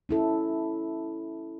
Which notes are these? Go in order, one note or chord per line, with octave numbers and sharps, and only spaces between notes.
C#4 E4 A4